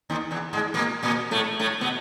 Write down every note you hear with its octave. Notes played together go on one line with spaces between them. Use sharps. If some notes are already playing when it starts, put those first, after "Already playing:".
D#2 D#3
E2 E3
G#2 G#3
A#2 A#3
A#2 A#3
A2 A3
A2 A3
B2 B3